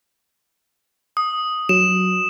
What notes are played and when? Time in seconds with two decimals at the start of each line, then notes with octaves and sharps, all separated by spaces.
1.17 D#6
1.69 F#3 E7